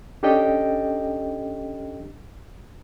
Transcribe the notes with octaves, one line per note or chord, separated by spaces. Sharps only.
C#4 D4 G4 A4 D#5 G5